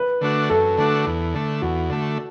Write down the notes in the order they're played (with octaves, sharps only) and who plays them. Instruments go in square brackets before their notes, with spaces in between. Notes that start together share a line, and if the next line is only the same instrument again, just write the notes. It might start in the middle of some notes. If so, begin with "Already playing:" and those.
Already playing: [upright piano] B4
[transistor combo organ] D3 A3 D4 F#4
[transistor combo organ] F#2 [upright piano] A4
[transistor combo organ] D3 A3 D4 F#4
E2
D3 A3
[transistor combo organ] E2 [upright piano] F#4
[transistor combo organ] D3 A3